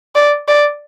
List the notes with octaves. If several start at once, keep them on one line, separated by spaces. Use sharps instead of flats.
D5
D5